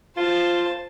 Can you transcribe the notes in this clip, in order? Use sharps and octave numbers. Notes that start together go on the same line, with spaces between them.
F4 C5 A5